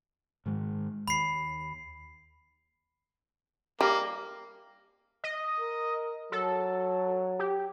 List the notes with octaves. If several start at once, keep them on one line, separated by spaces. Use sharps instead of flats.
G#2 D#3 G#3
D#2 B5 C7
G3 A#3
D#5
A#4
F#3 A4
G4